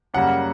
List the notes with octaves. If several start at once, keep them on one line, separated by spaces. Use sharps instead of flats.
F#2 C#3 G3 A#3 F#5